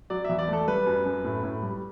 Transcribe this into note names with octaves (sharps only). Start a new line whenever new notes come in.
F#3 D5
E2 E5
D5
A3
A4
G3 B4
F#2
F#2
A2
A2
G3